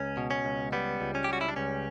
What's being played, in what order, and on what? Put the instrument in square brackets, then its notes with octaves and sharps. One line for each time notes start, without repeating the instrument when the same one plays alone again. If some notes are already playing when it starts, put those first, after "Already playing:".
Already playing: [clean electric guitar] C#2 C#4
B2
C#4
C#2
G3 B3
C#2
C#4
G4
G3 F#4
E4
D4
C#2 C#4